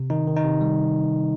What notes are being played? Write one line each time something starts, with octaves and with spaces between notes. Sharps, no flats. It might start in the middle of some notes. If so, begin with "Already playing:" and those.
Already playing: C3
D#3 D#4
D#3
D#4
C3
G3